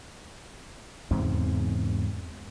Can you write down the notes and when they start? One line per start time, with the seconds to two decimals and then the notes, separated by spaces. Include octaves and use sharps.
1.11 E2 G#2 C#3 C4